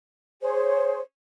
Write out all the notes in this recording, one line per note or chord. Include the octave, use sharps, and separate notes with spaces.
G#4 C5 C#5